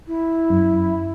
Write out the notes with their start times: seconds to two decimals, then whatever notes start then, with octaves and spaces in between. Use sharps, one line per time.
0.07 E4
0.50 F#2